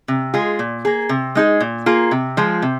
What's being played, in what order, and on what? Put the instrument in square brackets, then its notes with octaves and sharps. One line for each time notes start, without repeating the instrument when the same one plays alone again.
[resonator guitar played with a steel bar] C3
G#3 F4 G#4
A#2
A#3 G#4
C3
G#3 D#4 G#4
A#2
A#3 F4 G#4
C3
F3 G#3 F4
C3